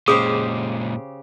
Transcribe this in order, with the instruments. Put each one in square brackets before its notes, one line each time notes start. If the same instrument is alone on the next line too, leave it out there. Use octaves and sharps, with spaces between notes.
[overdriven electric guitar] A#2 G#3 [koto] C#3 G4 C5 [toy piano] G#4 D6 D#6